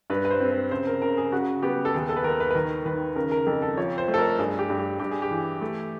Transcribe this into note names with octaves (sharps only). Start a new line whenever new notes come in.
G2 B4
B4
C5
C4
B4
C#3 C5
A#4
C#3 A#4
G#4
C#3 F#4
B3 G4
A4
D#2 G#4
A4
B4
D#2 A#4
B4
B4
D#3 A#4
D#3 B4
C#3 A#4
A#4
F2 A4
A4
F3 C#5
C5
A3
A4
A#4
G2 G#4
G4
G2
G4
G2 G4
G#4
G4
E3
A3